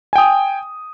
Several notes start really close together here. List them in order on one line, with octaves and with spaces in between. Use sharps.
G#5 G5 D#6